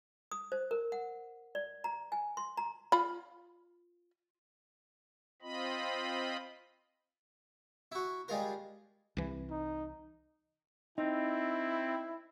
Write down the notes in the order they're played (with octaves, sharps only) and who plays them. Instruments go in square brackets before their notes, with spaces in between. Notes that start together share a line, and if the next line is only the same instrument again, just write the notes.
[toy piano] D#6
C5
A#4
F#5
D5
A#5
G#5
C6
A#5
[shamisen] F4 B5
[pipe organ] C4 F4 D#5 B5
[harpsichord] E4 F#4
G3 G#3 F4 A#4
[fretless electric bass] C2 E3
[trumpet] D#4
[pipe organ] C4 [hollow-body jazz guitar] D#4 [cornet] E4